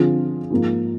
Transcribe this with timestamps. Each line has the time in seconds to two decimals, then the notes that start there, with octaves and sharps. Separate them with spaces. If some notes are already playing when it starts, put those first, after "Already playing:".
Already playing: D3 F3 C4 F4 G#4
0.50 G#2 F3 A#3